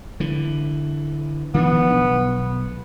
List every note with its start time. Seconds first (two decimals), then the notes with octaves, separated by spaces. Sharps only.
0.20 D3 E3
1.54 D#3 F3 B3 D4
1.90 B1